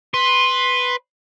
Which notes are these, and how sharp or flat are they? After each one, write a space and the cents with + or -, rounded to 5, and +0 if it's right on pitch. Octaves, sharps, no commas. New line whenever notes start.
B4 +0 C6 +10